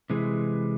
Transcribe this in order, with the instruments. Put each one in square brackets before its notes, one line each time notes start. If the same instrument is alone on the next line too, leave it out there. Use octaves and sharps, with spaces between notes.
[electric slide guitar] C3 E3 G#3